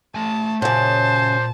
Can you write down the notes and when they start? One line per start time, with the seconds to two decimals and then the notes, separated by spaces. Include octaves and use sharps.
0.15 A3 G#5 A5
0.62 F#2 A#2 C#3 C5 A5